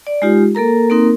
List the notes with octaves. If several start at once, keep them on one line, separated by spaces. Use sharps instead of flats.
D5
G#3 D#4 F4 G4
A#3 A4 A#4 A#5
A#3 C4 D#4 A#4